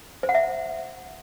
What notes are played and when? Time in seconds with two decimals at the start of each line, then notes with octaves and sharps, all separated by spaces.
0.23 C5
0.29 F#5
0.35 E5